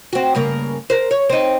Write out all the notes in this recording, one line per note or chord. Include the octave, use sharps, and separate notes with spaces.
C4 F#4
G2 C#3 A#3
A#4 C5
C#5
C4 D#4